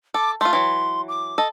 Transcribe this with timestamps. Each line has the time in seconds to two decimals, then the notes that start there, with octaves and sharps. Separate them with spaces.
0.14 A4 D6
0.41 A3 F4 C6
0.53 E3 F#3
1.08 D6
1.38 A4 D#5